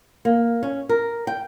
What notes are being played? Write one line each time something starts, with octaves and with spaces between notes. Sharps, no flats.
A#3
C#4
A#4
G5